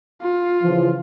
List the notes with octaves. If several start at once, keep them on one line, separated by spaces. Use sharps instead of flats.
F4
C#3 E3 F3